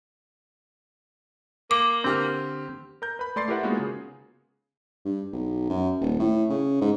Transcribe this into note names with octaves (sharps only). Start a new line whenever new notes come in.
A#3 D6
D3 C4 G4 F6
A#4 A#5 G6
B4 B5
A3 D5 C6 A6 C7
E4 G4 A#4 B4 E5 F#5
G#3 A#3 B3 D#4 F4 F#4
C#3 G#4
G2
B1
F#2
D#1
A2
C#3
G#2